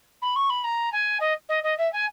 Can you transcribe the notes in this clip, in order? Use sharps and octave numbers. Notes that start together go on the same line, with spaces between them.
B5
C#6
B5
A#5
G#5
D#5
D#5
D#5
E5
G#5